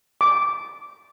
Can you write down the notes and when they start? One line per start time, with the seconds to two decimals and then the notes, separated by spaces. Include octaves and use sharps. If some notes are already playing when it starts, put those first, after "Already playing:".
0.21 D6